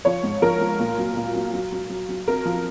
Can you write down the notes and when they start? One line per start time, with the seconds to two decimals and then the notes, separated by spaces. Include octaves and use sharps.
0.05 F3 C#5
0.23 G#2
0.42 F3 A#4
0.61 F3
0.79 A#2
0.98 F#3
1.17 A#2
1.35 F#3
1.53 F#3
1.72 F#3
1.90 F#3
2.09 F#3
2.27 F2 A#4
2.45 F3